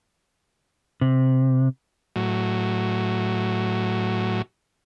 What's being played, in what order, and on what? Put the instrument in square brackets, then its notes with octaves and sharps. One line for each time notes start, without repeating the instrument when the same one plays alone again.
[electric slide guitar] C3
[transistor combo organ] A2 F#3